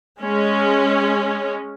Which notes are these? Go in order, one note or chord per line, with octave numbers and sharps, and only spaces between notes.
G#3 C#4